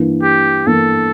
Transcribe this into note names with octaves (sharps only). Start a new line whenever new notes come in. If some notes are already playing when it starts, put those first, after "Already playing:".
Already playing: G2 E3 A#3
G4
G2 E3 A#3 A4